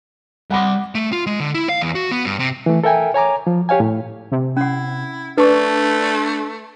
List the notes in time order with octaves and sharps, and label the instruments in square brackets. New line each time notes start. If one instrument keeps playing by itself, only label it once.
[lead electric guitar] G3 C6 [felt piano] F#5 B5 D6
[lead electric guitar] A3
F4
G#3
D3
E4
F5
E2
F#4
B3
G2
C3
[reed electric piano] E3 A3
A4 A#4 E5 G5 G#5
C#5 G#5 A#5 D6
F3
G4 C#5 F5 G#5
A2
[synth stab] C3
[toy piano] C#4 F#5 [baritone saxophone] E4
[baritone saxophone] A3 [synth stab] D4 [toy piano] B4 C#6